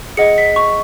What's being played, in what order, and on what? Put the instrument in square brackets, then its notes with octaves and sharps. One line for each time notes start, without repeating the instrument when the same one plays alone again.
[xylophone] G#4 D#5 F#5 C#7
B6
C#6